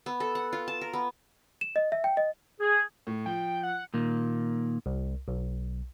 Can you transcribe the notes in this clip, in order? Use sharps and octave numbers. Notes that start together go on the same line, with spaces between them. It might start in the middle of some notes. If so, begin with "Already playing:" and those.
B3
A4
F#5
F4
A5
A#4
B3
E7
D#5
E5
G5
D#5
G#4
A2
F3 G5
F#5
A#2 D#3 A#3
C2
B1